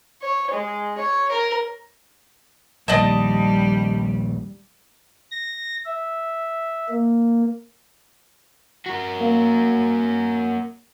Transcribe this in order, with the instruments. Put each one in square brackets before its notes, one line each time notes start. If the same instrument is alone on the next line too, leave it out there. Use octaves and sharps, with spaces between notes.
[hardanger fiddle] C#5
G#3
C#5
A#4
[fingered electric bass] A#1 D#2 [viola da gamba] G3 [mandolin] D5 D#5 A5
[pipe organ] A#6
E5
A#3
[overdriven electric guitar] F#4 A#4
[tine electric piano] A#3